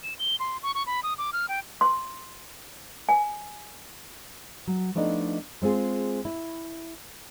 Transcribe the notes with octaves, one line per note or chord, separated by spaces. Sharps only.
E7
G7
C6
C#6
C#6
B5
D#6
D6
F6
G5
C6
G#5
F#3
F3 A3 B3 D4 D#4 D#5
G#3 C4 F4 G#4
E4